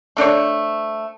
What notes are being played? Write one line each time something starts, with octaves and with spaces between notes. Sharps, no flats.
A3 D4 C5 C#5